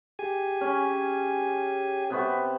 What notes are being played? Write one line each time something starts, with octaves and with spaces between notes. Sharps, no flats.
G4 G#4 G#5
C#4
C3 B3 C#6